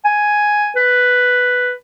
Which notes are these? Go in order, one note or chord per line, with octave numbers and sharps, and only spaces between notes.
G#5
B4